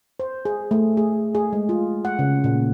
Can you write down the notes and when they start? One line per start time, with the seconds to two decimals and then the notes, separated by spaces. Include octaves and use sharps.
0.20 C5
0.45 G#4
0.71 A3
0.97 G#4
1.35 G#4
1.53 G#3
1.69 F4
2.05 F#5
2.19 C#3
2.44 A#2